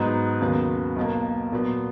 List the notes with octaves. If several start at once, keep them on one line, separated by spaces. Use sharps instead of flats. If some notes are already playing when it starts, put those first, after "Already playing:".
Already playing: G#2 F#3 B3 D#4
D#2 C#3 F#3 B3
B1 B2 A#3
A#2 F#3 B3